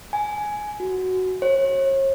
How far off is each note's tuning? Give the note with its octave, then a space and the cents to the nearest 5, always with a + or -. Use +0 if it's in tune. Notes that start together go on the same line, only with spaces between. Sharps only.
G#5 +10
F#4 +5
C#5 -40